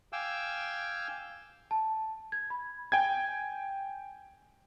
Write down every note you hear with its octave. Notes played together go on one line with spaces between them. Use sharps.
F5 G5 G#5 D6 E6
A5
G#6
B5
G5 G#5 G#6